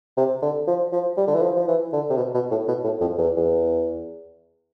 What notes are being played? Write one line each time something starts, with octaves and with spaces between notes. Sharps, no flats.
C3
D3
F3
F3
G3
D3
E3
F3
F3
E3
D3
C3
B2
B2
A2
B2
A2
F2
E2
E2